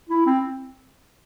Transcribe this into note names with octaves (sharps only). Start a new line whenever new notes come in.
E4
C4